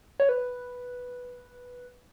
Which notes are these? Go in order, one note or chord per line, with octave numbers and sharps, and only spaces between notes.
C#5
B4